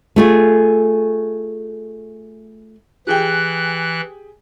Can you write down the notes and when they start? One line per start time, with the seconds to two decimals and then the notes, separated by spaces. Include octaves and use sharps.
0.16 A3 F4 G#4
3.07 E3 G4 G#4 G5 F#6